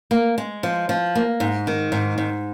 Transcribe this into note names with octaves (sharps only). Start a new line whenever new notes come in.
A#3
G#3
F3
F3
A#3
G#2
D#3
G#2
G#2